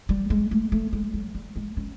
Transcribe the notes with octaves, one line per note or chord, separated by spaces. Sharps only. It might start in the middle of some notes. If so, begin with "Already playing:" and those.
G3
G#3
A3
A3
G#3
F#3
G3
G#3
C#4